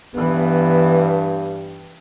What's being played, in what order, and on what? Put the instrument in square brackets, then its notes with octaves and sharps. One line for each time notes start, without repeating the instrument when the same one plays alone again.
[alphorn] G2 [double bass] E3 B3